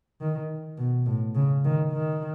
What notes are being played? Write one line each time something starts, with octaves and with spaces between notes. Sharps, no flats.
D#3
B2
A2
C#3
D#3
D#3